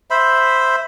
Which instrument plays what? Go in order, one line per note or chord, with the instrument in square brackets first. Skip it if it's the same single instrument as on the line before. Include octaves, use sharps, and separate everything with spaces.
[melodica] C5 E5 B5